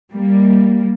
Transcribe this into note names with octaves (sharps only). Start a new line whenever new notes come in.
G3 A#3